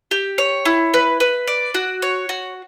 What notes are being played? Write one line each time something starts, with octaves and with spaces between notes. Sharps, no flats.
G4
C#5
E4
B4
B4
D5
F#4
C#5
F#4